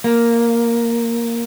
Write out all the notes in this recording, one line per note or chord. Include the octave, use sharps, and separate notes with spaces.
A#3